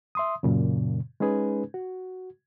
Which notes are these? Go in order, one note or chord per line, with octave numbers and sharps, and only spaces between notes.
E5 C6 D#6
F#2 A#2 C#3
G#3 C#4 D#4 G#4 B4
F#4